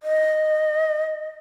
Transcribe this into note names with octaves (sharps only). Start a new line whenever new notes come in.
D#5